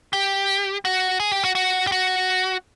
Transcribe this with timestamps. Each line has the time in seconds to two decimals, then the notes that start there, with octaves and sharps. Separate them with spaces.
0.13 G4
0.85 F#4
1.20 G#4
1.32 G4
1.44 F#4
1.55 F#4
1.87 G4
1.92 F#4